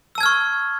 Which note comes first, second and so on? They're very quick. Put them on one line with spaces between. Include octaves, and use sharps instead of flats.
E6 A5 G#6 F6 C#6